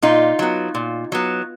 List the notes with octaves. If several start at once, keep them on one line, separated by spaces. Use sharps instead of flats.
A#2 D#4 F4
F#3 B3
A#2
F#3 B3